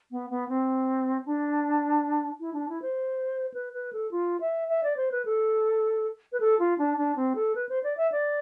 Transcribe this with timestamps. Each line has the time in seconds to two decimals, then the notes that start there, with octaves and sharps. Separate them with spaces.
0.11 B3
0.30 B3
0.49 C4
1.26 D4
2.40 E4
2.53 D4
2.69 E4
2.82 C5
3.54 B4
3.73 B4
3.93 A4
4.11 F4
4.41 E5
4.68 E5
4.84 D5
4.97 C5
5.12 B4
5.25 A4
6.32 B4
6.40 A4
6.59 F4
6.78 D4
6.98 D4
7.16 C4
7.36 A4
7.55 B4
7.69 C5
7.84 D5
7.97 E5
8.12 D5